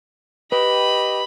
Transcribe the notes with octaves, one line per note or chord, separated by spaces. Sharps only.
G4 B4 D#5 B5